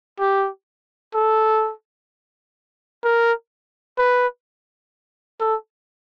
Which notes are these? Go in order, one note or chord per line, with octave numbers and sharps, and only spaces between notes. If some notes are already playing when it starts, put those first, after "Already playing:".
G4
A4
A#4
B4
A4